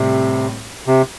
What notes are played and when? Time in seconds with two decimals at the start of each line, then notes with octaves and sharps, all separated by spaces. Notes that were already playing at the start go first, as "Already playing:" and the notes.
Already playing: A2 C3 G3 C4
0.87 C3